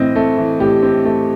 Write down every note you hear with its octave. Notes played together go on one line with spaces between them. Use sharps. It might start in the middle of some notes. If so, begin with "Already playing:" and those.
Already playing: A2 E3 C4 D#5
A3
E3
A2 G4
C4
A3